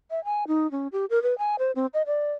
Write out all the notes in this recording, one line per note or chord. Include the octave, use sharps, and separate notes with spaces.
E5
G#5
D#4
C#4
G4
A#4
B4
G#5
C5
C4
D#5
D5